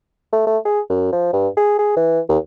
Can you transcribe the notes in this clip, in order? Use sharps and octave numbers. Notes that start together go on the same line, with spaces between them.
A3
A3
G#4
F#2
F3
G2
G#4
G#4
E3
D#2